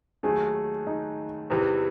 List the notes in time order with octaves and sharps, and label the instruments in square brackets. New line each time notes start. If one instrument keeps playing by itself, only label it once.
[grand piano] D#2 D#3 F#3 A3 [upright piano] G#4
[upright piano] D#4
[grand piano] E2 C3 E3 G3 C4